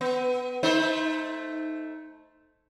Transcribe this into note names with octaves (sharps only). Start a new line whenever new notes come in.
B3
A3 D#4 C5